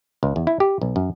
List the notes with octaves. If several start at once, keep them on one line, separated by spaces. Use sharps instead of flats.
C#2
E2
E4
G4
B1
F#2